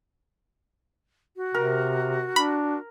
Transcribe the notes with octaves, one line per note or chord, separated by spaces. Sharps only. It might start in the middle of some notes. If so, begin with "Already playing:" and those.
F#4
C3 A#4
D4 B5